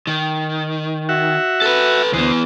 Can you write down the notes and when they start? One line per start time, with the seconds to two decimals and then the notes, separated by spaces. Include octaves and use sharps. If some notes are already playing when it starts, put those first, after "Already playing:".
0.07 D#3
1.09 F#4 E5 F#5
1.62 A4 B4
2.13 D2 E3 B3 C5 D#6